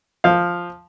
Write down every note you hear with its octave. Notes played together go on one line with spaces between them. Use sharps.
F3 F5